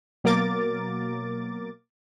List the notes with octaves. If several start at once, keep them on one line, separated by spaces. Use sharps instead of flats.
B2 F#3 A#3 A#4 D6 A6